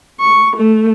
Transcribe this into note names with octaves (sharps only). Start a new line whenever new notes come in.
C#6
A3